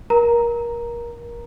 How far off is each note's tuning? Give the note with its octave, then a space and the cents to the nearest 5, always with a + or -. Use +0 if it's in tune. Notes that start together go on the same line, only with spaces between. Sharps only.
A#4 +25 A#5 +0